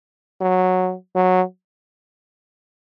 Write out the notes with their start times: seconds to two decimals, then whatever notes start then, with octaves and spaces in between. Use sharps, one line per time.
0.41 F#3
1.16 F#3